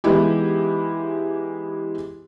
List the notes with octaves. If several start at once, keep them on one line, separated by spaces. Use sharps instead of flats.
E3 G#3 B3 D#4 E4 G4